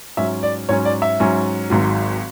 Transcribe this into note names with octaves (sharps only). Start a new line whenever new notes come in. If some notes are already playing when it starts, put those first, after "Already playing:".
G#2 F#3 C#4 E5
D5
G#2 F#3 C#4 C#5
D5
E5
G#2 F#3 C#4
G#1 G#2 F#3